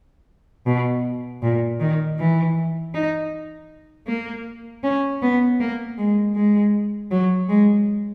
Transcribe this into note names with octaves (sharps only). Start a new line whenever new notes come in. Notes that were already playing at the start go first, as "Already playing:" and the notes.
B2
A#2
D#3
E3
D#4
A#3
C#4
B3
A#3
G#3
G#3
F#3
G#3